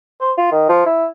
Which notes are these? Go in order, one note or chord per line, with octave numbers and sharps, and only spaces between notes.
C5
F4
D#3
F3
E4